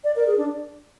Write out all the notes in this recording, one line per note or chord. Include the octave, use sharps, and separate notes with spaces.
D5
A#4
G#4
D4